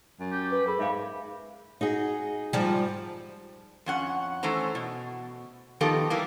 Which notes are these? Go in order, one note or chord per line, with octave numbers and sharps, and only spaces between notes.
F#2
G4
B4
G#4 A#4 B5
G#2 E5 F5
D#4 F#4 G#4
G#2 F3 G3
F2 C#4 F#5
E3 A3 C#4 C5 A#5
B2
D#3 F3 B3 G4 A4 A#4
E3 G3 A#3